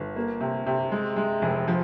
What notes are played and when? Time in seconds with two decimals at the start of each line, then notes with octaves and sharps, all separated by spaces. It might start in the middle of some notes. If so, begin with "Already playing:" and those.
Already playing: G1
0.16 A#3
0.41 C3
0.66 C3
0.92 G#3
1.16 G#3
1.42 F1
1.68 F3